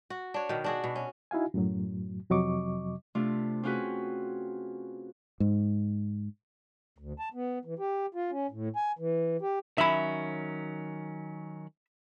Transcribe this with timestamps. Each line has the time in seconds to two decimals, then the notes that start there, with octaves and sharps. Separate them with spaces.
0.10 F#4
0.34 D4 C#5
0.49 B2 D#3
0.64 D4 F#4 G#4
0.84 B2
0.96 C#4
1.31 D#4 E4 F#4 F5 G#5
1.54 F#2 A2 F#3
2.30 F2 C3 F#3 D#5 C#6 D6
3.15 C3 A3 D4 F4
3.63 C4 C#4 F4 F#4 G#4 B4
5.40 G#2
6.98 D2
7.19 A5
7.34 B3
7.65 E3
7.79 G4
8.15 F4
8.31 C#4
8.51 A2
8.76 G#5
8.99 E3
9.42 G4
9.78 D#3 F#3 C#4 E5 B5